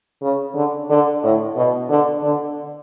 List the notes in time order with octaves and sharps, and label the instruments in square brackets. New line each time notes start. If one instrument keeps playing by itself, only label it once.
[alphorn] C#3
D3
D3
A2
B2
D3
D3